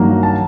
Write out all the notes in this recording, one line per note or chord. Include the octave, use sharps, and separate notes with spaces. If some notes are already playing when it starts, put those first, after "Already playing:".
Already playing: G2 D#3 F#3 A#3
A5